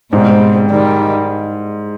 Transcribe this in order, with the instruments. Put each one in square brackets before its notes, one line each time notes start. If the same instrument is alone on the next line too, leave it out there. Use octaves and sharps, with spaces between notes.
[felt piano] G#2 [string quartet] B2 G3 C4
[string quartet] D#3 G3